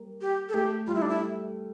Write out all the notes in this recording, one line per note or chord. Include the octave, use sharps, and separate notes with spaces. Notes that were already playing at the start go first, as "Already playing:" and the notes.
Already playing: G3 A#3
G4
A4
A3 G4
G3 F4
E4
D4
E4